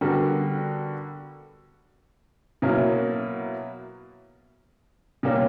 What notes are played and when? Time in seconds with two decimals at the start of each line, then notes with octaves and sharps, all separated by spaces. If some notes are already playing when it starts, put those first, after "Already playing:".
0.01 D3 G3 B3 F#4 A#4
2.62 B2 F#3 A#3 E4 A#4
5.23 B2 G3 A#3 C#4